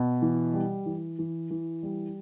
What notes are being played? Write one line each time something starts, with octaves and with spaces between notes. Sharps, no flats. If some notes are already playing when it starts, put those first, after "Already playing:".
Already playing: B2
E3
G3
E3
E3
E3
G3